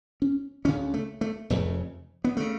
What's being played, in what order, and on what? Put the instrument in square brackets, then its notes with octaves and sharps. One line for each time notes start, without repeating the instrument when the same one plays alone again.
[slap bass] C#4
D2 C#4
C#3
A3
A3
F1 F2 C#3 A3
B3
C#3 A3